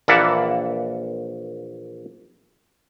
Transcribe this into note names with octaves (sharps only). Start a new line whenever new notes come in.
A#1 E3 A#3 D5 E5 F#5